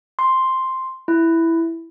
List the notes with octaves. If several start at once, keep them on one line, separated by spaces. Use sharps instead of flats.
C6
E4